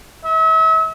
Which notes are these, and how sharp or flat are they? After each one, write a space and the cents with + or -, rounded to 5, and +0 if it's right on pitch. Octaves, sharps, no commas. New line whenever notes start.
E5 -40